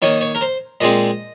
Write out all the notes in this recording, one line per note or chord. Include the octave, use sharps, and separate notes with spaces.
D#3 A#3 D#4 C#5
C#5
A#4
C5
A#2 G#3 C4 D#5